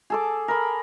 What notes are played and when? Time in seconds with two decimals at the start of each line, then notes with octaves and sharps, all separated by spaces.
0.10 G#4 A4 D6
0.48 A#4 B5